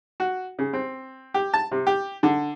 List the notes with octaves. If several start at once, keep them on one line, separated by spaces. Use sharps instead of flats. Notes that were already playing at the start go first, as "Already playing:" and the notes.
F#4
C#3
C4
G4
A5
C3
G4
D3